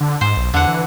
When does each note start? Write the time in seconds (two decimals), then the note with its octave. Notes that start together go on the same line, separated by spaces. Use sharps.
0.01 D3
0.21 G#2 C5
0.37 B1
0.54 E2 D3 F#5
0.67 E3